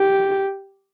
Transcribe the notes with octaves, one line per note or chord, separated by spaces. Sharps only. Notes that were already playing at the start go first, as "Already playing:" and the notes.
Already playing: G4